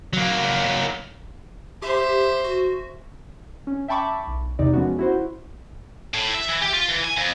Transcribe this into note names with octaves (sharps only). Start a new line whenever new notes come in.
F#3 A#3
G4 C5 E5
F#4
C#4
E5 G5 A5 B5 C#6 D6
B1
E2 C3 D#4 D5
F3 G#3 B3 C#4 F#4
E4 F#4 C5
A2
E5
E3
G4
F4
E3
G#5
F2